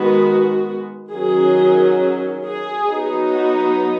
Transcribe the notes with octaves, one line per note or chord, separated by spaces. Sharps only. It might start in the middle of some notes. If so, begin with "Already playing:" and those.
Already playing: D#3 G#3 B3 F#4
D#3 F#3 C#4 G#4
G#4
F#3 B3 D#4
F#4